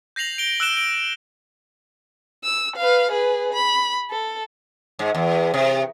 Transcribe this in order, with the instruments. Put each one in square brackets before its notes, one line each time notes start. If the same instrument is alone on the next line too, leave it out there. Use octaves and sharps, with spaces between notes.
[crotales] G6 A#6 C7 F7 F#7
D7 G7
E6 F#6 D7 E7 G7
D7
[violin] E6
B4 F5
G#4 B4
B5
A4
[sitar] G#2
E2
C3